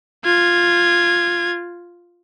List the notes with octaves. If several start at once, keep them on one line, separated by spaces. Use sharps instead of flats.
F4 G#6